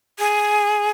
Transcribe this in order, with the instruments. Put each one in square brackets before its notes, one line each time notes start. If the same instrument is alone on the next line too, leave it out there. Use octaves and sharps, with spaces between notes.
[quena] G#4